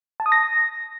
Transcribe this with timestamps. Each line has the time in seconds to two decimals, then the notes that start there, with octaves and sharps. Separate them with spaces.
0.20 A5
0.26 D#6
0.32 A#6